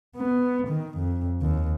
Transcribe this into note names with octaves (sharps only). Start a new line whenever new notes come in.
B3
D#3
F2
D#2